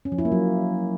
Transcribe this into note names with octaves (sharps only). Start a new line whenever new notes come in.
C#4
F3
E4
A#3
F#3